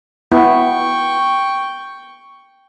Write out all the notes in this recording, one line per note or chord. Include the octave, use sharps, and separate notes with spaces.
B3 E4 G5 C#6